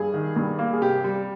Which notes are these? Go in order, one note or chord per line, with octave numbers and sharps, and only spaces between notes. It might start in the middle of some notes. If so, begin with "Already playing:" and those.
Already playing: G2 G#4
D#3
G2
A#3
G#4
C3 G4
G3